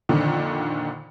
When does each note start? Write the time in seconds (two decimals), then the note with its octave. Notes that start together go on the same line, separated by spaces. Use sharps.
0.09 F2 A#2 D3 D#3